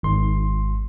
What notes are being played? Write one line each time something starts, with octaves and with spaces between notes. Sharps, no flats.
G#1 C6